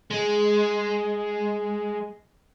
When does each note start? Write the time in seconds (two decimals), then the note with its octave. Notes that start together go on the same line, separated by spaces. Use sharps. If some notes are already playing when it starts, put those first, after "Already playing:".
0.11 G#3